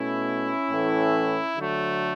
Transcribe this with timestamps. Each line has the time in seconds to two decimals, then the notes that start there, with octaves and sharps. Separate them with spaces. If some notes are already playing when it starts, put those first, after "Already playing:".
Already playing: B2 A3 C#4 E4
0.71 A2 E3 A3
1.56 D3 F#3 A3